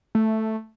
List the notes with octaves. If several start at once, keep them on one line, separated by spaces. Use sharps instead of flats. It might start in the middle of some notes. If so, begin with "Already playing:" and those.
A3